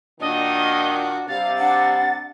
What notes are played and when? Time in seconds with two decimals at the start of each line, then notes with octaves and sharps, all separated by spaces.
0.21 A#2 D#3 D4 F#4 D#5
1.28 C3 G3 F5 A6
1.58 D4 F#5